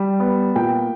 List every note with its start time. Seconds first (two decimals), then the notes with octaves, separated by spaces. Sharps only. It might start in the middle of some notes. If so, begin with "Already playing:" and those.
Already playing: G3
0.20 B3
0.56 A#2 G5